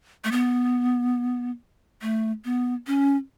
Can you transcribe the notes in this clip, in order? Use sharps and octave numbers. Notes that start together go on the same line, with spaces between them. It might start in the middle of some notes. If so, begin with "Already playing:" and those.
A3
B3
A3
B3
C#4